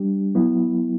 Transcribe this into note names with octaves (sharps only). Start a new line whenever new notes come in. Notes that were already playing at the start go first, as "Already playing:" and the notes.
Already playing: G3 D4 G4
F#3 B3 E4